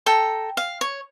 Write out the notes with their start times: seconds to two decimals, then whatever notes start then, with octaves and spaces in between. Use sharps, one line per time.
0.06 A4 G5 A#5
0.57 F5
0.81 C#5